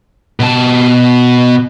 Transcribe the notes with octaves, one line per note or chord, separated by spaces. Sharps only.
B2 A5